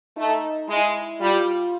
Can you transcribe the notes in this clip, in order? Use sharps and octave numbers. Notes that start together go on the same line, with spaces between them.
A3 D#4
G#3 E4
G3 F4